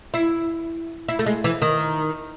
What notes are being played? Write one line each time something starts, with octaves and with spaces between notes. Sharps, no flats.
E4
E4
A3
G#3
E3
D#3